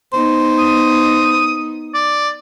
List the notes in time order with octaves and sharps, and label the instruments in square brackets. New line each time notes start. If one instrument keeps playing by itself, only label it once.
[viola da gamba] B3 D#4 [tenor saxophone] C5
[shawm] D#6
D5